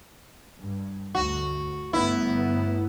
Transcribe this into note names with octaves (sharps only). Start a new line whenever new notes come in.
G2
D2 F#4
G1 A3 B3 E4